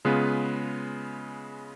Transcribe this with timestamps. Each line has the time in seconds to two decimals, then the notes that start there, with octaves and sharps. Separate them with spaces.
0.05 C#3 G#3 B3 F4 B4